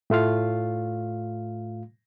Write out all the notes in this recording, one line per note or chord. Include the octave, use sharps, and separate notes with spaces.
A2 A3 F4 F5